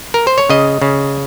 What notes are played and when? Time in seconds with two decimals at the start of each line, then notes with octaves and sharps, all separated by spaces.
0.14 A#4
0.27 C5
0.38 C#5
0.50 C#3 D#5
0.82 C#3